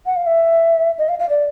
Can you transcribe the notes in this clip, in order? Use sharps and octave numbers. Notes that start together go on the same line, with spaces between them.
F#5
F5
E5
D#5
F5
F5
D5